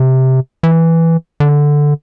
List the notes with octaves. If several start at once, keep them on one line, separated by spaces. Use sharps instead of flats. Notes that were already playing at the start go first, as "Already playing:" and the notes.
Already playing: C3
E3
D3